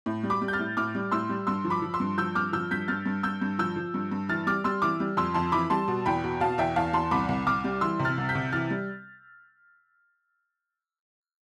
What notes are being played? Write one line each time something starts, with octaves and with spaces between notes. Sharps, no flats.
A2
G3
B5 D6
G3
G6
F6 A6
A2
A2 D6 F6
G3
A2 C6 E6
G3
G2 C6 E6
F3
B5 D6
F3
C6 E6
G2
F3 E6 G6
G2 D6 F6
F3 E6 G6
G2 G6 B6
G2 F6 A6
G2
G2 E6 G6
G2
F3 E6 G6
F3
G2
G2
E3 F6 A6
G3 D6 F6
G3 C6 E6
E3 D6 F6
G3
F2 C6 E6
F2 A5 C6
E3 B5 D6
G3 A5 C6
B2
E2 G5 B5
B2
B2 F5 A5
E2 E5 G5
E2 F5 A5
E2 A5 C6
C2 B5 D6
C2
C2 D6 F6
G3
E3 C6 E6
C3
F6 A6
C2
G6 B6
C3
E3 F6 A6
G3